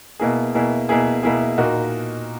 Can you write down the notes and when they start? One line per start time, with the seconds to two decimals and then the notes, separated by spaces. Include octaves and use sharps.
0.20 B2 A#3 E4 G#4
0.55 B2 A#3 E4 G#4
0.89 B2 A#3 E4 G#4
1.23 B2 A#3 E4 G#4
1.58 A#2 A#3 D#4 F#4